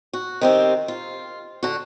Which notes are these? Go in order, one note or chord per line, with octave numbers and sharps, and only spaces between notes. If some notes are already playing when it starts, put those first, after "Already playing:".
F#4
D#3 C4 G4
F4
D3 F#4